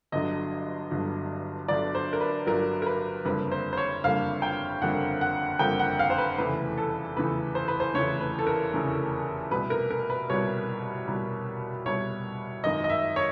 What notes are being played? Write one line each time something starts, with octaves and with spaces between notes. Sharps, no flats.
G1 G2 D3 F#3 D#5
G1 G2 D3 F#3
G1 G2 D3 F#3 D5
C5
A#4
B4
G1 G2 D3 F#3 A#4
A#4
B4
F#1 F2 D3 G3 A#3 B4
C5
C5
C#5
F#1 F2 D3 G3 A#3 F5
G5
F#1 F2 D3 G3 A#3 F#5
F#5
F#1 F2 D3 G3 A#3 G5
F#5
F5
C5
B4
F1 E2 C#3 E3 A3 B4
A4
F1 E2 C#3 E3 A3 B4
C5
B4
C5
F1 E2 C#3 E3 A3 C#5
B4
A4
A#4
F1 E2 C#3 E3 A3
C2 B2 G3 B4
A#4
A#4
B4
C2 B2 G3 C#5
C2 B2 G3
C2 B2 G3 C#5
G#1 F#2 D#3 D#5
D#5
E5
C#5